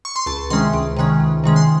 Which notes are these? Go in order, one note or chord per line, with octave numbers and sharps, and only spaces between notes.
C#6
C6
C#2 A5
C3 D#3 G#3 C#4 C6
C#2
C3 D#3 G#3 C#4
C#2
C3 D#3 G#3 C#4
C6